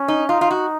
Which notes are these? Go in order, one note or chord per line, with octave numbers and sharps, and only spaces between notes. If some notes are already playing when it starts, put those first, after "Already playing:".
Already playing: C#4
D#4
D#4 F4
F4
F#4